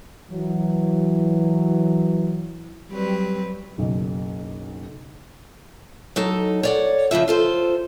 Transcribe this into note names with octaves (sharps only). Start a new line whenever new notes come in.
E3 F#3
F#3 G3 C4 B4
F#1 B1
F#3 D#4 A4
C#5 D5 F#5
C#3 F3 F4 E5
F4 A4 C5